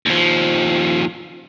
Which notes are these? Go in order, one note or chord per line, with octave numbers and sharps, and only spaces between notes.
D#2 F3